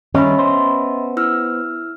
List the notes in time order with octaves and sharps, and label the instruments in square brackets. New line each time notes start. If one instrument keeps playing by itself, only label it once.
[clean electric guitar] D#3 G3 D4 [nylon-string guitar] C#4 [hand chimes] D#5 E5 B5
[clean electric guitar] B3 C5
[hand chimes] E4 E6 F6